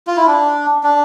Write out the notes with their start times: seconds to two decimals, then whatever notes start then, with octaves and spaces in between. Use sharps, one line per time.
0.07 F4
0.17 E4
0.27 D4
0.83 D4